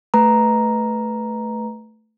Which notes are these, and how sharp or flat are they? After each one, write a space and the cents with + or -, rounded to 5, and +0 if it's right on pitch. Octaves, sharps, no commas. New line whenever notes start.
A3 +0 B4 +0 A#5 +5